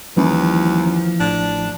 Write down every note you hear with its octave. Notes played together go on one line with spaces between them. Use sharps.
D#2 E3 F3 G3 C#4 E4
A1 D4